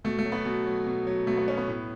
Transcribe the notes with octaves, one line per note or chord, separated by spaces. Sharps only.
B2 A3
A3
F#3
B3
B2
F#3
B2
F#3
B2 A3
B3
F#3 C#4
B3
A2